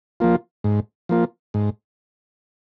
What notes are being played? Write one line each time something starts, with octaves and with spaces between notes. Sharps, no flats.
F3 A#3 F4
G#2
F3 A#3 F4
G#2